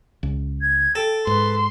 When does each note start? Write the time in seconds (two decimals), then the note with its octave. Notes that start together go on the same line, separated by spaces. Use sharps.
0.23 C#2
0.61 G#6
0.95 A4 G5
1.27 G#2 B4 C6